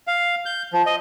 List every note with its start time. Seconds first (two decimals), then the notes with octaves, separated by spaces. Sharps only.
0.07 F5
0.46 G6
0.73 F3
0.86 D#5